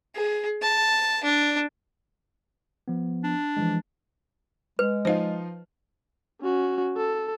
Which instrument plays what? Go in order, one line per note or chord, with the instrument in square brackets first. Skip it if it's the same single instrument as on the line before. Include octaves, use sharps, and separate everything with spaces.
[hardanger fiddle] G#4
A5
D4
[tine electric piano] F3 B3
[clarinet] D4
[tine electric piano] E3 F3 G#3
[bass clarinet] G#3 [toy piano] B4
[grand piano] F3 D#4 F4 [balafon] C5 D#5
[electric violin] C#4 F#4
A4